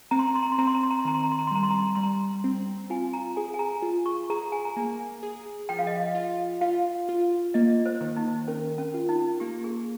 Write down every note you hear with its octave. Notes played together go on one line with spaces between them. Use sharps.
C4 A#5
C6
A#5
C6
A#5
C6
C4 A#5
C6
A#5
C6
A#5
C6
D#3 A#5
C6
A#5
C6
A#5
C6
G3 A#5
C6
A#5
C6
A#5
G3 C6
A#5
C4
F4 G#5
A#5
G#4 G#5
G#5
A#5
F4
C#6
G#4 A#5
G#5
A#5
A#3 G#5
G#4
F3 G5
F5
D#5
F5
F4
F4 F5
F4
A#3 D#5
C5
D#3
D#4
C#4 A#4
C#4
F4
D#4
A#3 G4
G#4